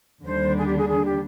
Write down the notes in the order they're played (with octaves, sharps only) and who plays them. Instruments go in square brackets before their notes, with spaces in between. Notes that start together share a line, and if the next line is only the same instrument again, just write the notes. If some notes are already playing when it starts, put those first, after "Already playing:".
[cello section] D#2 D3 G3 D4 [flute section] C5
[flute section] G#4
G4
G#4
G#4
G4